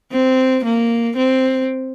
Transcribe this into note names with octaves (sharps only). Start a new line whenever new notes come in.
C4
A#3
C4